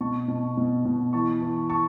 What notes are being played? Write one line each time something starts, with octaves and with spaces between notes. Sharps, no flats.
B2 A5 C#6
B2
B2
B2
E3 A5 C#6
E3
A5 C#6